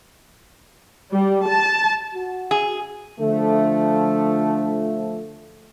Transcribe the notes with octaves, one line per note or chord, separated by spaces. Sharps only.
G3
A5
F#4
G#4
D3 F3 A3